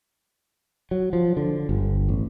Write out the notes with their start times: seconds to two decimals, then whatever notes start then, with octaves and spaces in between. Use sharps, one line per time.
0.91 F#3
1.13 F3
1.37 D3
1.69 G1
2.09 A1